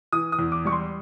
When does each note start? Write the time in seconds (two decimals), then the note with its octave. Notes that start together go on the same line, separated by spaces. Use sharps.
0.13 E3 D#6
0.32 D#6
0.39 E2
0.52 D6
0.65 G3 C#6
0.72 C6